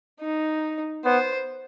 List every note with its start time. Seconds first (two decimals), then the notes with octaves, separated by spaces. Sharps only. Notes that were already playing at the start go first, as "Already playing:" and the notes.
0.21 D#4
1.05 B3 C5